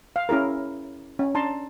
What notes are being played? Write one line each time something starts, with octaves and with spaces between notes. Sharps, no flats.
F5
C#4 E4 G#4 A#4
C#4
D4 A5 A#5 C6